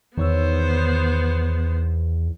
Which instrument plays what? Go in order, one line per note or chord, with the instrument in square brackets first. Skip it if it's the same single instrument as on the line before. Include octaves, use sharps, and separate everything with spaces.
[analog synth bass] E2 [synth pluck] D#3 C#5 E6 [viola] B3 C5